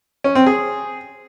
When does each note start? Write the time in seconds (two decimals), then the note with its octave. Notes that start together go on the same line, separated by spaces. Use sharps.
0.24 C#4
0.35 C4
0.46 G#4